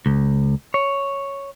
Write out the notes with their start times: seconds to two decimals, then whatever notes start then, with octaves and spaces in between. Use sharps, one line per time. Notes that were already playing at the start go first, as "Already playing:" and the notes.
0.06 C#2
0.74 C#5